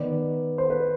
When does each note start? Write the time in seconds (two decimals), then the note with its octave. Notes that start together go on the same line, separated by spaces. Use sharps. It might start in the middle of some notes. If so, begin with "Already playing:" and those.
Already playing: D#3 B3 D5
0.58 C5
0.70 B4